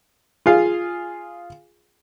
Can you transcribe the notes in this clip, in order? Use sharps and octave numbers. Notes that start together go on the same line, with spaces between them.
F4 G#4 F5